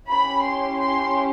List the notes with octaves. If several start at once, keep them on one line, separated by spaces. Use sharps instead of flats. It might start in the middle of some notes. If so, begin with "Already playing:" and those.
C#4 E4 G4 B5
C6
C6